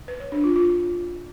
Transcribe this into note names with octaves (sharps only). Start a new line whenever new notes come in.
B4
C#5
D4
F4
F4